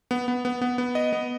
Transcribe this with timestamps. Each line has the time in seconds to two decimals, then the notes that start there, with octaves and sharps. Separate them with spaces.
0.11 B3
0.28 B3
0.45 B3
0.62 B3
0.78 B3
0.95 D#5
1.13 B3